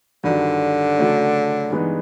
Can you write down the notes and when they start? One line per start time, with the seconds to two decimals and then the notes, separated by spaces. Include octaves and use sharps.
0.24 G2 D3 D#3 F#3
0.97 C#3 F#3 A3 C#4
1.71 G2 E3 G#3 B3 D#4